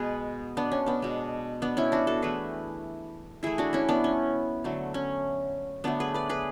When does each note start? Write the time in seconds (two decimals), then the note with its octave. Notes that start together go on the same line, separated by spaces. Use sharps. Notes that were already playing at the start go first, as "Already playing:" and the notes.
Already playing: B2 G#3 B3 G#4 B4
0.57 B3 D4
0.72 C#4
0.86 B3 D4
1.02 B2 G#3 B3
1.62 B3 D4
1.77 C#4 E4
1.92 D4 F#4
2.07 F#4 A4
2.22 E3 A3 G#4 B4
3.43 E3 A3 E4 G#4
3.58 D4 F#4
3.73 C#4 E4
3.89 B3 D4
4.04 C#4
4.64 D3 F#3 A3
4.94 C#4
5.84 D3 F#3 A3 B3 D4
6.00 G#4 B4
6.14 B4 D5
6.29 G#4 B4